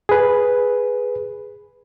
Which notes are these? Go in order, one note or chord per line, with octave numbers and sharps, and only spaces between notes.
G#4 B4